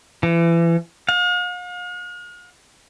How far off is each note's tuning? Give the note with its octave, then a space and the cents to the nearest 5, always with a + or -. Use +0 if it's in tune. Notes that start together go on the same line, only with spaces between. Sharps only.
E3 +30
F5 +45